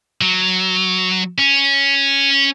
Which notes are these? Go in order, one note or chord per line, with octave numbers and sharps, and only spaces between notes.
F#3
C#4